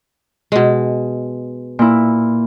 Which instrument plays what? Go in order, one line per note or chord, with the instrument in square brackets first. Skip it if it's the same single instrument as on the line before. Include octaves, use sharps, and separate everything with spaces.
[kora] B2 G#3
[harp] A#2 E4